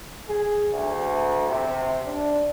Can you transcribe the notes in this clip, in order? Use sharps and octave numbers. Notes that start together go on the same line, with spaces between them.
G#4
D2
C3
D4